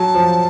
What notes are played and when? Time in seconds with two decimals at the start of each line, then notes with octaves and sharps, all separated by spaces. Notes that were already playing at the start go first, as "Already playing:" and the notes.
Already playing: F#3 A5
0.15 F3